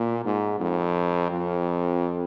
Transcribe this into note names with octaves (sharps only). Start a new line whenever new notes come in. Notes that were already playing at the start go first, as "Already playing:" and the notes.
Already playing: A#2
G#2
F2
F2